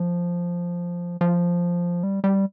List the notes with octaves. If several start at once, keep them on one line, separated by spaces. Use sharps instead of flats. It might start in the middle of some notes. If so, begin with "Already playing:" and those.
Already playing: F3
F3
G3
G3